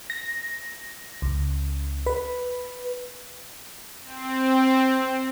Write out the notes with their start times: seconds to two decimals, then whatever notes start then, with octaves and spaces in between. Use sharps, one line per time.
0.10 A#6
1.22 C#2
2.06 B4
4.03 C4